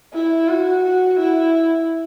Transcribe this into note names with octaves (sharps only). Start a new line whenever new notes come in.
E4
F#4
F#4
E4